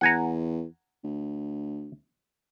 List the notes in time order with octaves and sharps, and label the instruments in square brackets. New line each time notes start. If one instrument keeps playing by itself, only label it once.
[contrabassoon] E2 [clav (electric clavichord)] F#5 G#5 A#5
[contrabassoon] D2